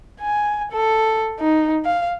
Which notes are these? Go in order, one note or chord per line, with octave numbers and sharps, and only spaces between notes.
G#5
A4
D#4
F5